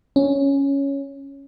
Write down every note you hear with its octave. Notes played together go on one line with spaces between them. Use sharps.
C#4